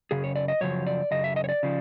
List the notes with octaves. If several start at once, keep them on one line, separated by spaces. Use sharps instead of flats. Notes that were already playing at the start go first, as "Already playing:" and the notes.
F#2 C#3 G#4
C#5
D5
D#5
F#2 C#3 F3 C#5
D5
F#2 C#3 D#5
E5
D#5
C#5
D5
C#3 F3